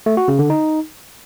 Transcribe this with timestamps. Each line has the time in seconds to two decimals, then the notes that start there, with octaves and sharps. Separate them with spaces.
0.06 A3
0.17 F#4
0.28 C#3
0.39 D3
0.50 D#4